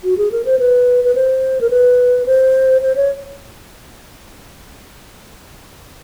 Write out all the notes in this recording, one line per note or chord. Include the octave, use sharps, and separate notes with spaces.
F#4
G#4
A#4
C5
B4
B4
C5
A#4
B4
C5
C5
C#5